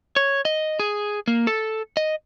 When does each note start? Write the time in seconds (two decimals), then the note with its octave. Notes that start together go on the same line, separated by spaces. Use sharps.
0.16 C#5
0.45 D#5
0.79 G#4
1.28 A#3
1.47 A4
1.97 D#5